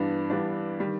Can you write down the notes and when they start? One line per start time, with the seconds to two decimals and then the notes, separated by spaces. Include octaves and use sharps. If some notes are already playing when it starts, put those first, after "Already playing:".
Already playing: G2 E3 G3 B3 D4
0.30 G2 E3 G3 B3 D4
0.80 D#3 G3